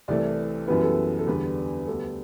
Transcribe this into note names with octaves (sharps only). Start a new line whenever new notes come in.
C2 C3 E3 A3 D5
F#2 E3 G3 B3 B4
A4
A4
E2 D3 G3 B3 B4
D2 D3 G3 B3 A4